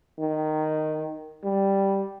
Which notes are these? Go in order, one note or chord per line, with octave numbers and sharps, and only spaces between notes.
D#3
G3